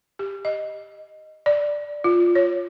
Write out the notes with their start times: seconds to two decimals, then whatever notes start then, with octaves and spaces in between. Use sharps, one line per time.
0.19 G4
0.45 D#5
1.46 D5
2.04 F4
2.35 C#5